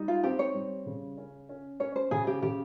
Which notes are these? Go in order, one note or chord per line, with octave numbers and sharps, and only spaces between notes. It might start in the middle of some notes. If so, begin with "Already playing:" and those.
Already playing: G3 D#4
F4
C4 G4
C#5
G3
C#3
C#4
C#4
C#4 C#5
C5
C#3 G#4
G4
C#3 G4